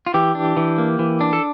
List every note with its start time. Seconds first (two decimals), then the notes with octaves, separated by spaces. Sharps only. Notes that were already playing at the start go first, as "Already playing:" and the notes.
0.06 F4
0.14 E3 G4
0.35 D4
0.57 E3
0.78 A#3
0.99 E3
1.21 D4
1.33 A4